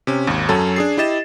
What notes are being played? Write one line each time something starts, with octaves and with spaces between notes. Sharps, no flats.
C3 C#4
G#1 D#2
F#2 F#3 C#4 A4 A5
D4 G#4 C7
E4 G4 D#5 A6 E7